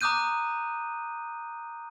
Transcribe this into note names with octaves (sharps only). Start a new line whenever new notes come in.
A#5 D6 D#6 F#6 G6 D#7